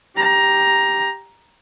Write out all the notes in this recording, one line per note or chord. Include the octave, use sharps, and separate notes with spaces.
G4 A#5